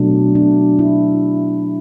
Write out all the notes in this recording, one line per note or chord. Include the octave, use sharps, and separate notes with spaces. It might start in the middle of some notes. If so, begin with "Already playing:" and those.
Already playing: B2 F#3 A3 D4
D4
E4